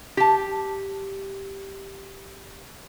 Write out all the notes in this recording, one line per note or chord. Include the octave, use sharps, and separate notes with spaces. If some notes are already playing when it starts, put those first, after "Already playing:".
G4 A5